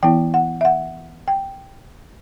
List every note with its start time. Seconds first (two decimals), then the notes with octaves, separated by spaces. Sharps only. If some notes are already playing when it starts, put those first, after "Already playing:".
0.03 E3 B3 E4 G5
0.34 F#5
0.61 E5
0.65 F#5
1.28 G5